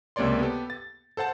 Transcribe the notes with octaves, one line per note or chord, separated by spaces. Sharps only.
C#2 C3 A#3 C#5 D5 C6
B3 G4 A4
A6
A4 C5 F#5 A5